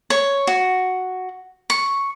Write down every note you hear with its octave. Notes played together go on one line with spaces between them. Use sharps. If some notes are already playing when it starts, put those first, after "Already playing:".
C#5
F#4
C#6